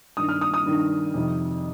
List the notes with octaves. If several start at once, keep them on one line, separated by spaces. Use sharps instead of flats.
G2 D#3 D#6
F6
D#6
D#6
G2 D#3
F2 C3 D#3